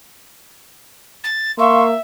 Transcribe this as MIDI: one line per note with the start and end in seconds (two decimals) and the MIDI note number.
1.23 1.51 93
1.58 1.95 58
1.58 2.01 76
1.58 1.84 77
1.58 1.84 84
1.58 1.84 85